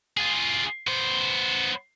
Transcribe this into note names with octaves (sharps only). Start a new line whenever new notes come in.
F4 G#4
B3 C5